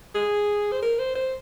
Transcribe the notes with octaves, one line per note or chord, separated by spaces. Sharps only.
G#4
C5
A#4
C5
C5